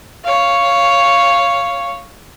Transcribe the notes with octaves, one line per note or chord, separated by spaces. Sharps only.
C#5 F5